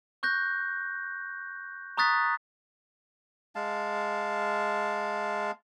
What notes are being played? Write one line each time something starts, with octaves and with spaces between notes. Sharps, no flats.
C#6 F#6 G6 A#6
A#5 C#6 D#6 F#6 A6 B6
G#3 F5 A5